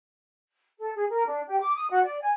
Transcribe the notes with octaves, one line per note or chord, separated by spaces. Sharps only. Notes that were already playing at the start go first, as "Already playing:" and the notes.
A4
G#4
A#4
D4
G4
D6
D#6
F#4
D5
G#5